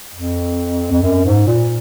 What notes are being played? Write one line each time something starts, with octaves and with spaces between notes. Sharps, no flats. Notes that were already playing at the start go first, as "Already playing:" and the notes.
F2
F2
F#2
G#2
A#2